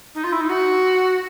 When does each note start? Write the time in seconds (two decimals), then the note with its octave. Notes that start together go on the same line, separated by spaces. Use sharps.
0.15 D#4
0.24 F4
0.32 E4
0.41 D#4
0.49 F#4